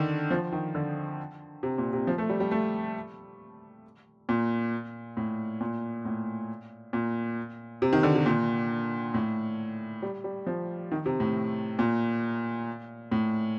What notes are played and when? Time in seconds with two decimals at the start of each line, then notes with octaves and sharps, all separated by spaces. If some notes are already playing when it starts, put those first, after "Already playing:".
Already playing: D3 D#3
0.31 F3
0.53 D#3
0.75 D3
1.63 C3
1.78 A#2
1.93 C3
2.07 F3
2.18 A3
2.29 G3
2.40 G3
2.51 A3
4.29 A#2
5.17 A2
5.61 A#2
6.05 A2
6.93 A#2
7.82 C3
7.93 D#3
8.03 D3
8.15 C3
8.26 A#2
9.14 A2
10.02 G3
10.24 G3
10.47 F3
10.92 D#3
11.06 C3
11.20 A2
11.79 A#2
13.12 A2